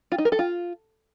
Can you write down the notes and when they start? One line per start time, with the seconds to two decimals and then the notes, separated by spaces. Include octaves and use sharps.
0.12 F4
0.18 D#4
0.25 A#4
0.32 A4
0.39 F4